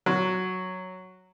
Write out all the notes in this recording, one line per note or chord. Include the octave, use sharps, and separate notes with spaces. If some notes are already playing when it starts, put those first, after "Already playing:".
F#3